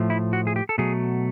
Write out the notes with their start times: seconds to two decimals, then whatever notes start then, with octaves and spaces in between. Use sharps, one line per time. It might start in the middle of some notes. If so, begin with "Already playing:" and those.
Already playing: A2 F3 A3
0.10 E4
0.33 F#4
0.47 G#4
0.56 G4
0.69 A4
0.78 B2 F#3 A3 G#4